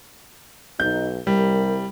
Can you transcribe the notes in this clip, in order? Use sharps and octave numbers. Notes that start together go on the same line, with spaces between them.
B1 D#4 G6
C2 G3 A#4